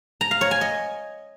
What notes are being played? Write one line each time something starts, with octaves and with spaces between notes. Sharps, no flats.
A#5
F5
C#5
G#5
D#5